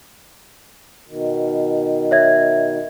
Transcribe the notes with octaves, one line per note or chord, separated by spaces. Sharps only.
B2 D#3
C#5 E5 G#6